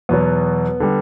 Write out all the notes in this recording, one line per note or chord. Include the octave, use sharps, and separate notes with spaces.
E2 B2 F#3 B3
D3 G3